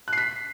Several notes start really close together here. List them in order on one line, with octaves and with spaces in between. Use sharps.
F#6 C7 B6